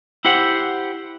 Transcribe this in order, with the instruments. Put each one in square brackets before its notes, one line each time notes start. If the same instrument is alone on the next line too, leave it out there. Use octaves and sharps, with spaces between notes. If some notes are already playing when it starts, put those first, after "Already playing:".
[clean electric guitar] E4 G4 C5 F#5